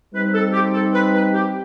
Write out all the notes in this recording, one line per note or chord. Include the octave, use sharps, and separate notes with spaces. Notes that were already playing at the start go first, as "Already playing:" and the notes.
G3 C4 D#4 B4
A4
G4
A4
B4
B4
G4